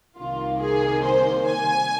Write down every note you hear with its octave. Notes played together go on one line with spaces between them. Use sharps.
C2 C3 D#3 A#3 F4
G#4
C5
G#5